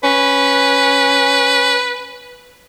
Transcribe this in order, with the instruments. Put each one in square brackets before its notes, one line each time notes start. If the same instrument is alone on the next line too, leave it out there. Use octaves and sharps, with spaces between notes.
[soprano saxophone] C#4 [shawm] B4